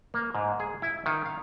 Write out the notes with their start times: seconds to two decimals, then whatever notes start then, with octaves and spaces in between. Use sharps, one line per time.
0.14 A#3
0.35 G#2
0.60 G#4
0.82 E4
1.06 D#3
1.26 F5